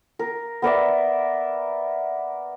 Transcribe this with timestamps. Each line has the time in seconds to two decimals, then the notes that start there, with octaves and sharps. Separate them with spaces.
0.19 A#4
0.62 B3 A#4 D5 E5